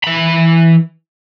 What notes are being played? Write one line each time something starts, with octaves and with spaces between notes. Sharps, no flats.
E3 B5